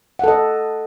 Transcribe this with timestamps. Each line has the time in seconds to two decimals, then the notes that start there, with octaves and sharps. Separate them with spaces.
0.19 F#5
0.24 A4
0.28 D#5